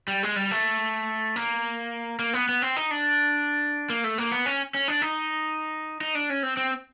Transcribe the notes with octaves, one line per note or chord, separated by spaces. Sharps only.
G3
G#3
G3
A3
A#3
A#3
B3
B3
C4
D#4
D4
A#3
A3
A#3
B3
C#4
C#4
D4
D#4
D#4
D4
C#4
C4
C4